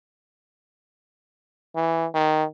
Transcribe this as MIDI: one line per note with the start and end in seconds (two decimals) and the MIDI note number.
1.76 2.06 52
2.14 2.44 51